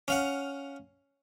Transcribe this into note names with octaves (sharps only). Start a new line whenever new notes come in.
C#4 F5 F#5